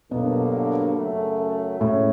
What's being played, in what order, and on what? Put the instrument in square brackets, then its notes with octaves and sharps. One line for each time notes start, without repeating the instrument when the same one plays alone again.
[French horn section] G2 D3 F#3 A#3 [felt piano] B2
[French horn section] F#2 C#3 F#3 A3
[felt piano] A2 [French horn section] G#3 C#4